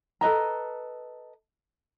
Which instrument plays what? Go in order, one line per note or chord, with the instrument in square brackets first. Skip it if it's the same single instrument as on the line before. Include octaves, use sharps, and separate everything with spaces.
[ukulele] A4 B4 D#5 A#5